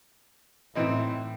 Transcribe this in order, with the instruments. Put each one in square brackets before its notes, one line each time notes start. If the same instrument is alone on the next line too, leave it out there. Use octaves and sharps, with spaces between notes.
[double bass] A2 [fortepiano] E3 C4 D#4